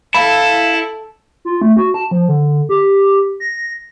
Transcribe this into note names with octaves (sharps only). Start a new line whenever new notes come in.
E4 A4 F5 B5
F4
A3
F#4
A5
F3
D3
G4
A#6